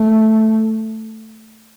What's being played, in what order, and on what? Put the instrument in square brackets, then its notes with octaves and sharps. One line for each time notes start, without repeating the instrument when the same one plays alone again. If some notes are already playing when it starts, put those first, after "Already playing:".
Already playing: [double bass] A3